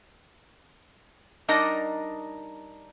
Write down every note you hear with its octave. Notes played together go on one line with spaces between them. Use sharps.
G3 D4 D#4 A#4 D#5